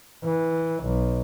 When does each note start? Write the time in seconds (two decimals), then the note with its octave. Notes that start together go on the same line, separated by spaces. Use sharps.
0.24 E3
0.84 B1